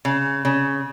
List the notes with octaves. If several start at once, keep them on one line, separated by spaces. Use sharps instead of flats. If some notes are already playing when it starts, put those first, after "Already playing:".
C#3
C#3